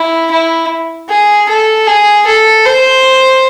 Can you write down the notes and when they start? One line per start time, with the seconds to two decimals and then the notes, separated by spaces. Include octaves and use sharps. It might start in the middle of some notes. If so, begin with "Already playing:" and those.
Already playing: E4
0.32 E4
1.09 G#4
1.49 A4
1.87 G#4
2.27 A4
2.65 C5